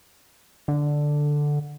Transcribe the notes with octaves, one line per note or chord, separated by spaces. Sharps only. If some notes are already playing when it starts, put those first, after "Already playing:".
D3